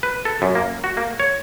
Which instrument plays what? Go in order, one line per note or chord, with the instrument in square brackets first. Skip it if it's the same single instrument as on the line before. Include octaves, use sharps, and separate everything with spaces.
[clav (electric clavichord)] B4
A4
F#2
A#3
F#4
A#3
C#5